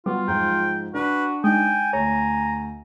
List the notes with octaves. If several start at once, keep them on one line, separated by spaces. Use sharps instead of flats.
F#3 G3 B3 F4
G#2 F3 G5
D4 F#4 B4
G#3 D#4 G5 G#5
D2 C#5 A#5